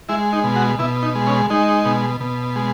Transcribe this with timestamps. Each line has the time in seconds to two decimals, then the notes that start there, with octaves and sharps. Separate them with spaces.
0.09 G#3 E4
0.33 D#4
0.44 B2
0.56 F#4
0.79 B2 E4
1.03 D#4
1.15 G#3
1.27 C#4
1.50 G#3 D#4
1.85 B2
2.20 B2
2.56 G#3